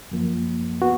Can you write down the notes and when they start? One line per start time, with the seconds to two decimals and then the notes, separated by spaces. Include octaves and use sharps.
0.12 F#2 F3 A#3
0.82 B3 F#4